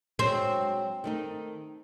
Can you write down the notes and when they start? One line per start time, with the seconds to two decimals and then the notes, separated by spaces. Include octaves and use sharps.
0.19 F#3 G#3 C4 D4
1.04 D#3 A3 D#4